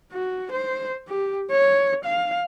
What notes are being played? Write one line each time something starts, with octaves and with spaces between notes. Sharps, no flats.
F#4
C5
G4
C#5
F5